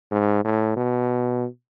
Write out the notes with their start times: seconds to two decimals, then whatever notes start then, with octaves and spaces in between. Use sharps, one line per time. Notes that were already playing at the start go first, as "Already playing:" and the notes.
0.12 G#2
0.45 A2
0.76 B2